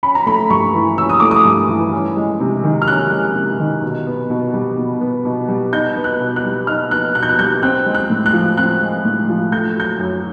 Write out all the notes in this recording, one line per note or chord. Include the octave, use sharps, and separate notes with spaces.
C#4 B5
A#5
A3 B5
G2 C#6
E3
C#4 E6
D#6
A3 D6
D#6
G2
E3
C#4
G#3
C3
D#3
F6
C#4 F#6
G#3
C3
D#3
B2
B3
B2
G3
B2
B3
B2
G3
D#4 G6
B3
F#6
B2
F#6
G3
D#4 F6
B3 F#6
B2 F#6
G6
F#6
G3 G6
C4 F#6
G#3
F#6
A2
F#6
F3
C4 F#6
G#3
A2
F3
A3 G6
F#3 G6
F#2